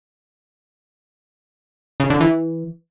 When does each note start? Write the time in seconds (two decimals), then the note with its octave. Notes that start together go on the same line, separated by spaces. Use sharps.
2.00 C#3
2.10 D3
2.20 E3